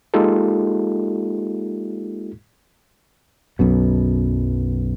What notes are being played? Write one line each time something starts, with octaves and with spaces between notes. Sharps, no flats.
G#3 A#3 D#4 F4 G4 A4
B1 F#2 B2